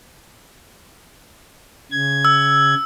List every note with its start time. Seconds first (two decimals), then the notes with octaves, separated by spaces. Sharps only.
1.91 C#3 G#6
2.25 E6